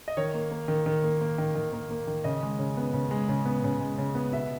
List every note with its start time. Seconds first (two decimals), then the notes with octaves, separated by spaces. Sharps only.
0.08 D#5
0.17 D#3 C#5
0.34 A#3
0.51 A#3
0.68 D#3
0.86 D#3
1.04 A#3
1.21 A#3
1.38 D#3
1.55 D#3
1.73 A#3
1.90 A#3
2.07 D#3
2.24 C#3 D#5
2.42 G#3
2.59 C#3
2.77 B3
2.94 C#3
3.11 G#3
3.29 C#3
3.45 B3
3.64 C#3
3.80 G#3
3.98 C#3
4.15 B3
4.33 B2 E5